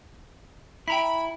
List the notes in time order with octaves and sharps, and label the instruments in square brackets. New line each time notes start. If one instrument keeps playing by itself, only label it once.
[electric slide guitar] E4 [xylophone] G5 A#5 B6 [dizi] B5